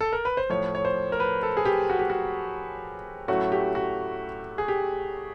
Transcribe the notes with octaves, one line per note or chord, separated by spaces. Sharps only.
A4
A#4
B4
C5
A2 F3 A3 C#5
C#5
C5
A#4
B4
A4
G#4
G4
F#4
G4
F#4
A2 F#3 A3 C#4 E4 F#4
G4
F#4
G#4
G4